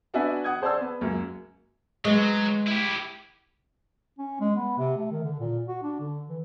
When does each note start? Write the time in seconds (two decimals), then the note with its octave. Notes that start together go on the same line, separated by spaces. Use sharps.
0.14 B3 D4 F#4 B4 E5 G#5
0.44 F#5 D#6 G#6
0.62 G#4 C5 D5 A5 E6
0.80 B3
1.01 C#2 F#2 A#3
2.05 F#3 G#3 B3
2.67 E4 G4
4.19 C#4
4.40 G#3
4.56 B3
4.78 C3
4.97 A3
5.11 D#3
5.24 D3
5.40 A#2
5.68 F#4
5.83 D4
6.00 D3
6.29 E3